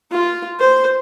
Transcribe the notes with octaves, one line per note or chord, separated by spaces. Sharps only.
F4
C5